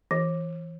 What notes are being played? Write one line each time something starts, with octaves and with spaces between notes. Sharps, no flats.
E3